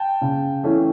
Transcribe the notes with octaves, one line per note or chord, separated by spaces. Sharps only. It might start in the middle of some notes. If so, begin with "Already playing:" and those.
Already playing: G5 A5
C#3
E3 A3 C#4